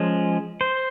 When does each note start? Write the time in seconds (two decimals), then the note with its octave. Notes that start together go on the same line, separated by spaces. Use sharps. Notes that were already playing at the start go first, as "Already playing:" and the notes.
Already playing: F3 G#3 C#4
0.61 C5